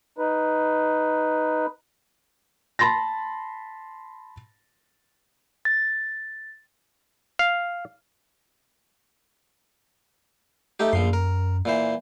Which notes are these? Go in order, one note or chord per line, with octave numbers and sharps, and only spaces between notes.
D#4 B4
A5 B5 C6 A6 A#6
A6
F5
A3 D#4 G4
A#1 F#2 F3 C6
A#4
A#2 E3 C5